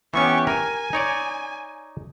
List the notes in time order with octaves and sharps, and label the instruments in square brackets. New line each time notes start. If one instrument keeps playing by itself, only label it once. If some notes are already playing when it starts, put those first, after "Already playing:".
[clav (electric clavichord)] E3 B3 C#4 [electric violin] G4 C#6
[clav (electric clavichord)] A#4 [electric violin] G#5
[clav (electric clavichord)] D#4 C#5 D5